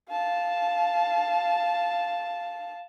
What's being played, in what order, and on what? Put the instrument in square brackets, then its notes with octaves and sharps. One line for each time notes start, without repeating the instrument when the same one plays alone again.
[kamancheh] F5 A5